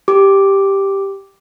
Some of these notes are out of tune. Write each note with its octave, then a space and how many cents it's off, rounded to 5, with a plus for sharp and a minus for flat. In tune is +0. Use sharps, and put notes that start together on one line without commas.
G4 +0 D6 +0